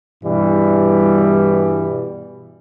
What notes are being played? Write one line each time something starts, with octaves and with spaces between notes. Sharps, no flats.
G2 B2 E3 G3